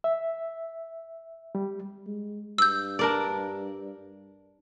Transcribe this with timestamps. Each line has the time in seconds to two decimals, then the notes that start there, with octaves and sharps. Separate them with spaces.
0.04 E5
1.55 G3
2.06 G#3
2.58 G2 E6 G6
2.99 D4 A#4 D5